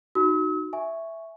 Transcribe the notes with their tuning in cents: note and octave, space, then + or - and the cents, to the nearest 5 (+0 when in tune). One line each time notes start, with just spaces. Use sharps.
D#4 -20 F#4 +0 E6 -45
E5 +0 G#5 +5 C#6 +0